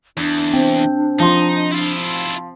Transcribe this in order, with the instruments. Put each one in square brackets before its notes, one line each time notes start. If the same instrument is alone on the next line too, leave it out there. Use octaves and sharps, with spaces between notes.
[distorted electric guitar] E2 [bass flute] D4
[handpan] C4
[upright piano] F3 C6 [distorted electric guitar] D#4
[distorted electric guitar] E4 F4